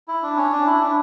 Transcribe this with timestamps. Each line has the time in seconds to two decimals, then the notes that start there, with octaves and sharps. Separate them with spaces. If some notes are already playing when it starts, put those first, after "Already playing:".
0.08 E4
0.23 D4
0.37 C#4
0.52 D4
0.66 E4
0.82 D4